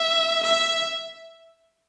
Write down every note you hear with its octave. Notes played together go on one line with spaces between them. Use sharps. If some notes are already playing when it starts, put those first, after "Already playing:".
Already playing: E5
E5